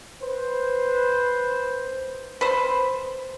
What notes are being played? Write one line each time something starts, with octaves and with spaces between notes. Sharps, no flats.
B4 C5
B4 C5